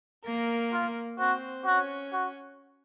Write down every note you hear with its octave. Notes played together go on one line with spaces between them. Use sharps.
A#3 A#4
F4
C4 F#4 C5
C#4 F#4 C#5
F#4